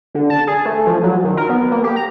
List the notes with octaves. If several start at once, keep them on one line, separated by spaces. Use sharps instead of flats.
D3
A5
G#4
A3
F3
F#3
D#3
A#4
B3
A#3
G4
A#5